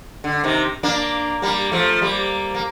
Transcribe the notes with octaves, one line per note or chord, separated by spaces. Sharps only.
D3
C3 D#3
A#3 D4
G3 A#3
F3 A3
G3 A#3
A#3